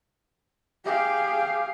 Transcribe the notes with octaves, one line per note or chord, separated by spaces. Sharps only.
G4 G#4 F5